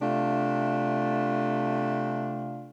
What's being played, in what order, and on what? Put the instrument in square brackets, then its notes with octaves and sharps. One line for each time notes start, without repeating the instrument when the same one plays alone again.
[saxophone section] C3 A3 D4 F4